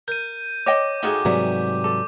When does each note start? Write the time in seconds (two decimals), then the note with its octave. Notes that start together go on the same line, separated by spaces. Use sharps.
0.08 A#4 G6 D#7
0.66 C#5 D#5 G5 D6
1.03 A2 D#4 F4 F#4 G#4 G5
1.25 G#2 C3 E3 F#3 G3 A3
1.84 A4 D6